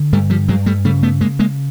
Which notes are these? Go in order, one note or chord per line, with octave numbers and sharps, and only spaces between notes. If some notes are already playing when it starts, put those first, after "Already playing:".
Already playing: D3
G2 G3 A3
F3 G3
G2 F#3 G#3
G3 A3
C#3 G3 A3
A3 B3
C#3 G#3 A#3
G#3 A#3